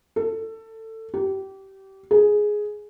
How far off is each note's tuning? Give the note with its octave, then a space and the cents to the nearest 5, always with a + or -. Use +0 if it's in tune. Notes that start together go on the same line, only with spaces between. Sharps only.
A4 +20
G4 -25
G#4 +5